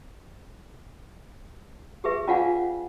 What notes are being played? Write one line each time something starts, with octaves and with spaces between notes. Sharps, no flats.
G4 G#4 B4 E5
C#4 F4 D5 F5 F#5 G#5